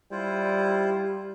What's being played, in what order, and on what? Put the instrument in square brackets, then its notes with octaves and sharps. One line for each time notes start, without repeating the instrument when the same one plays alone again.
[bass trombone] G3 [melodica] E4 F4 C5